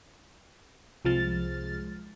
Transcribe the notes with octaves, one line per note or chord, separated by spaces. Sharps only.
C2 C3 F3 G#3 F6 A6